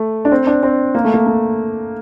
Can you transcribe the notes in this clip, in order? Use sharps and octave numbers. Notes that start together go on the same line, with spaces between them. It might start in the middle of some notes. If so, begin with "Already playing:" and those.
Already playing: A3
D4
C4
D4
C4
A#3
A3
A#3
A3